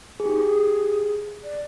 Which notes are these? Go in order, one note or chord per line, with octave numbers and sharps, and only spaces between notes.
G#4
D#4 G4
G#4
D5